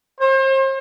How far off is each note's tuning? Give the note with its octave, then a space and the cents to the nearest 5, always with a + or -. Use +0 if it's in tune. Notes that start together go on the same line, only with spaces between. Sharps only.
C5 +40